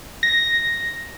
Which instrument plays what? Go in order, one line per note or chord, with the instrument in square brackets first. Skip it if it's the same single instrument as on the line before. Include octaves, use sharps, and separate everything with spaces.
[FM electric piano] A#6